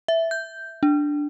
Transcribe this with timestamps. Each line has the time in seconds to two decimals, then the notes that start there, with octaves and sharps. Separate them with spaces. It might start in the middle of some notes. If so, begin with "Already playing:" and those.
0.08 E5
0.31 G6
0.83 D4